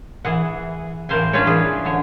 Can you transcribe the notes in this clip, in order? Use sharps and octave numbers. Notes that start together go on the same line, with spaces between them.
E3 G#4 F#5
A2 E3 A#4 C5 F5 G#5
C#4 D4 F4 B4 C#5
E3 G#4
D3 C#5